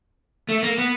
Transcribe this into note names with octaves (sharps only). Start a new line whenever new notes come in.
A3
A#3
B3